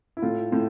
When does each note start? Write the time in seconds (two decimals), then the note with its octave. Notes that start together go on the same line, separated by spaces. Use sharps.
0.17 E4
0.22 A2 F4
0.52 A2